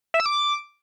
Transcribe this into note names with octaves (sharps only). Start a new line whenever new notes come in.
E5
E6
D6